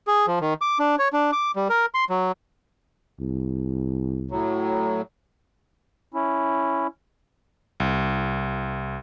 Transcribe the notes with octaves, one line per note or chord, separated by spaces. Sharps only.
G#4
F3
D#3
D6
D4
C#5
D4
D6
G3
A#4
C6
F#3
C2
A2 F#3
C#4 E4
C2